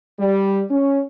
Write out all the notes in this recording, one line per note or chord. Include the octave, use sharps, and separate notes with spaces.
G3
C#4